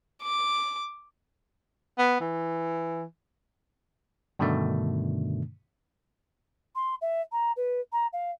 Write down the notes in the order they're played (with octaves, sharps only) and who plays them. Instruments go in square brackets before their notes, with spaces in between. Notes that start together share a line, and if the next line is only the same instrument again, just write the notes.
[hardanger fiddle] D6
[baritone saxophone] B3
E3
[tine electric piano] G2 B2 D3 D#3 A3 D4
[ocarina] C6
E5
A#5
B4
A#5
F5